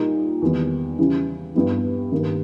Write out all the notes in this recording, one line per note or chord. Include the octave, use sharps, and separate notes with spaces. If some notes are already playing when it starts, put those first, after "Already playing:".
Already playing: A#2 G3 A#3 D#4
E2 D#3 G3 B3
C#3 E3 G3 C#4 E4
G2 G3 B3 E4
G2 D#3 A#3